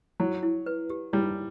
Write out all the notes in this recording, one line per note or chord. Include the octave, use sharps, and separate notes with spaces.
F#3 E4
E4
B4
G4
G3 E4